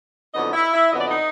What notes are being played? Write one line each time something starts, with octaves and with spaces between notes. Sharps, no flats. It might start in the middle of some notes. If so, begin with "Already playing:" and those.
F2 D3 F#3 B3 D#4 D#5
E4 E5
E4 E5
F2 D3 F#3 B3 D#5
D5
D#4 D#5